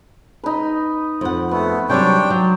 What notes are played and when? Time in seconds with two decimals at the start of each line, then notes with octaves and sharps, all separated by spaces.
0.44 D#4 B4
1.21 F2 F#5
1.51 A3 B3 B4
1.89 C3 F#3 G3 D4 C#5 G5 C6 C#6
2.30 F#3